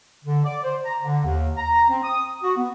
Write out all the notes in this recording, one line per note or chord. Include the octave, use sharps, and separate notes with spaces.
D3
D5
C5
A#5
D3
D#2
A#5
C4
D#6
F#4
B3